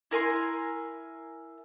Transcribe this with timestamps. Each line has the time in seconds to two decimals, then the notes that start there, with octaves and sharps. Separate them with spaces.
0.11 E4 A#4 G#5 C6